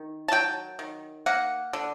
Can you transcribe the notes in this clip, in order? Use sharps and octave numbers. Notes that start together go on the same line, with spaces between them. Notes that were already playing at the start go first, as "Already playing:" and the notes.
Already playing: D#3
A5
F#3 G5
D#3
A#3 F#5
D3